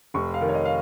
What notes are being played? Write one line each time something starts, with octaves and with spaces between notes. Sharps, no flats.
F1 C#6
F5
D#3
C#5
D#5
F5